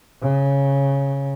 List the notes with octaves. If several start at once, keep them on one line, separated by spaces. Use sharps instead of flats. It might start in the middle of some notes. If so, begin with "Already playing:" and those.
C#3